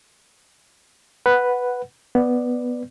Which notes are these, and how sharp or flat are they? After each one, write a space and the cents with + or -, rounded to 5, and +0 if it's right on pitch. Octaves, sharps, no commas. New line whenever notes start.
B4 +0 F#5 +0
B3 +0 B4 +0 D5 +10